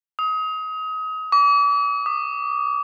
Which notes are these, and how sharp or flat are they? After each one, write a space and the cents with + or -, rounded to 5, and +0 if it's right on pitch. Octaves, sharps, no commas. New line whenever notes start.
D#6 +30
D6 -40
D#6 -45